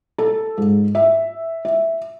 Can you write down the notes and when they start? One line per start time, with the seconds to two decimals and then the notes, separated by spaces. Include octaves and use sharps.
0.18 A4
0.58 G#2
0.95 E5
1.65 E5